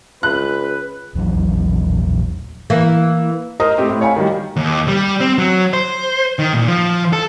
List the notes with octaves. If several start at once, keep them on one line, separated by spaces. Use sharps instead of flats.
C#2 B4 F#6
D#1 A#1 E2 F#3
E3 A#3
A#4 C5 D#5 A#5 D#6
A3 C4 G4
A2
C#5 F5 G#5 B5
D#3 F#3 G3
D#2
G3
C4
F#3
C5
D#3
A#2
F3
A4